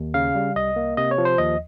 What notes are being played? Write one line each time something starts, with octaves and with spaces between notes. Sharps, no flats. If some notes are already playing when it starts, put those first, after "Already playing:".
Already playing: D#2
C#3 F5
G3
C2 D#5
A#3
C3 D#5
C#5
F3
C5
D#2 D#5